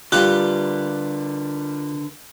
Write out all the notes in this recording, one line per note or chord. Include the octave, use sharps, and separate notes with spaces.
D3 G3 F4 G4 A#4 B4 F#6